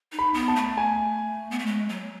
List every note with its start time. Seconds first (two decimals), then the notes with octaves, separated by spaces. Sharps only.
0.12 D#4
0.19 B5
0.34 B3
0.48 A5
0.56 A3
0.77 G#5
1.51 B3
1.59 A3
1.66 G#3
1.89 F#3